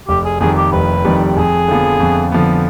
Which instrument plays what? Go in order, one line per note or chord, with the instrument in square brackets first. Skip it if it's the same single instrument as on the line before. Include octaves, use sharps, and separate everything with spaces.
[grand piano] F1 [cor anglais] G4
[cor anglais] G#4
[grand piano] F2 D#3 G3 [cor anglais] G#4
[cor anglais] G4
[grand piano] F1 [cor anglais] B4
[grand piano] F2 D#3 G3
[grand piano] F2 [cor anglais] G#4
[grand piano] D3 F3 B3
F2
D3 F3 B3